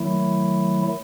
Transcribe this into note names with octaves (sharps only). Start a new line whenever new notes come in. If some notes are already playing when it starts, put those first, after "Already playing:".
Already playing: D#3 F#3 A3 E4